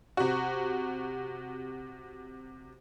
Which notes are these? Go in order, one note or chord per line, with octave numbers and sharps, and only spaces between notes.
C3 F#4